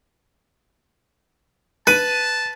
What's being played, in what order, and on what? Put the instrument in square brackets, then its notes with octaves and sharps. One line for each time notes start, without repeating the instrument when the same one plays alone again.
[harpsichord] B4 [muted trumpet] A5 [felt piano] D#7